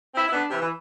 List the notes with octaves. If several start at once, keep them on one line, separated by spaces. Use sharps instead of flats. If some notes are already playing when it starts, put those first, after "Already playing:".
C4 E4
E4
B3 D4
C3 E3
E3